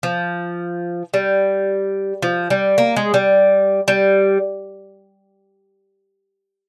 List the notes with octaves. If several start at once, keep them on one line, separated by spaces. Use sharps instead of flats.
F3
G3
F3
G3
A#3
G#3
G3
G3